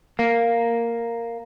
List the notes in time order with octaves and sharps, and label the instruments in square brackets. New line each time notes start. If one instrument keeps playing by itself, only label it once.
[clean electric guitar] A#3